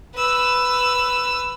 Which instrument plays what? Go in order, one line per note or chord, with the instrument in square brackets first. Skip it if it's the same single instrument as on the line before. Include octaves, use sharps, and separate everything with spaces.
[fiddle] B4 E6